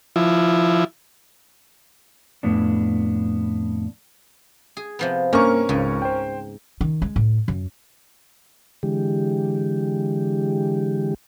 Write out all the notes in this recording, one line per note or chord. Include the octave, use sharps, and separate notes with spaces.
F3 E4
F2 A2 B3 D4
G#4
C3 F3 B3
G2 A#3 C#4 A#4 C#6
C#2 G#2 C#3
C5 G5
D#3
G#3
A2
F#2
D3 E3 G#3 G4